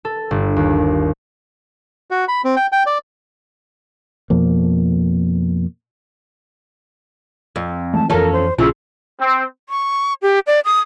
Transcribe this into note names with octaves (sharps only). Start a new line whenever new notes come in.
A4
G1
D#2
F#4
B5
C4
G5
G5
D5
F2 B2 F3 A#3
F2
E3 G#3 A3 A5
F2 E3 C#4 F4 A4 A#4
C5
A#1 F2 C#3 F3 E4
C4
C#6
G4
D5
D#6